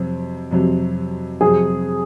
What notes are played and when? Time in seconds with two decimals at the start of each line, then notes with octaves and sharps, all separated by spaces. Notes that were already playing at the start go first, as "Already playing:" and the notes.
Already playing: F2 C3 F#3 C4
0.51 F2 C3 F#3 C4
1.41 F2 C3 F#3 C4 G#4